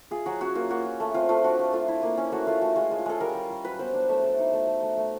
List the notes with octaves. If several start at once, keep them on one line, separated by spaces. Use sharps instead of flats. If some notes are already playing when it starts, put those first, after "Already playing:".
F4 G#4
F#3 F#4
C#4 F#4
A#3 F4
A#3 F#4
F4
A3
C4 F4
A3 F4
D4 F#4
F4
A3 F4
E4
A#3
C#4
A3 F#4
A3 F4
A3 F#4
G#3 F4
G#3
F4
G#3 A4
G3 A#4
G3
G3
F#3 B4
B3 C5
D4 D5
A3 E5
A3
D#4
A3
A3
A3
A3